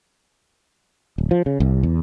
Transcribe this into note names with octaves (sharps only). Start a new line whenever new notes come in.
D1
F3
C#3
C2
E2